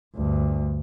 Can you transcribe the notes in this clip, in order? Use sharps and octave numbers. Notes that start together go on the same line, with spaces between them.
D2 G2